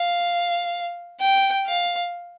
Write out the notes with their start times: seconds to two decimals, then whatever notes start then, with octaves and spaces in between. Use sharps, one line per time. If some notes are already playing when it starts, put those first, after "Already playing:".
Already playing: F5
1.21 G5
1.67 F5